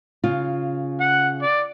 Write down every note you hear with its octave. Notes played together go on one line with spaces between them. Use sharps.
C#3 F4
F#5
D5